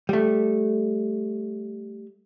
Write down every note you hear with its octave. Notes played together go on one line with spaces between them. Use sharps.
G3 A3